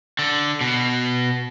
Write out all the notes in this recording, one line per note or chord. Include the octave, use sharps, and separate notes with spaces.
D3
B2